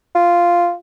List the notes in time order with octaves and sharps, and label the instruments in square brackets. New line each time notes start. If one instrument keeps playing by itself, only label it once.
[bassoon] F4